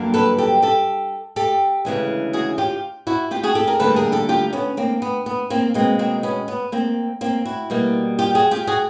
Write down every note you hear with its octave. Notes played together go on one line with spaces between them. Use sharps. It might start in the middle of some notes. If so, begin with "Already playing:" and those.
Already playing: G2 D3 F#3 A#3
A4 B4
G4 A4
G4 A4
G4 A4
D2 C#3 E3 G#3
F#4 G#4
F4 G4
E4 F#4
F4 G4
F#4 G#4
G4 A4
G#4 A#4
D2 D3 G3 A#3 A4 B4
G#4 A#4
G4 A4
F4 G4
B3 C#4
A#3 C4
B3
B3
A#3 C4
B2 G#3 A#3 C4
A#3 C4
B3 C#4
B3
A#3 C4
A#3 C4
E4 F#4
B2 G3 A#3
F4 G4
F#4 G#4
F4 G4
F#4 G#4